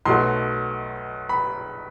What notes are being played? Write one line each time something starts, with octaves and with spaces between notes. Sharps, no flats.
B1 B2 F#3 A3 C6
B5